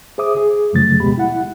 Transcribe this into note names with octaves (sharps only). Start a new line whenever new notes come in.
G#4 C5 E5 D6 D#6
G#4
F#2 C#3 F3 F#3 A3 A6
D2 B2 G#3 B3 G4 B5
E4 F#5